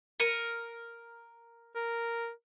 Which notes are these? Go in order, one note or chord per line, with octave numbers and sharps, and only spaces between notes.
A#4 C#7 D#7
A#4